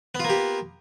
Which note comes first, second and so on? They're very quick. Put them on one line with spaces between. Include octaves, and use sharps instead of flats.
B3 F4 A#3 G4